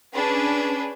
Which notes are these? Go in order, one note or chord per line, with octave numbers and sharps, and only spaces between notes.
C#4 D4 G#4 B4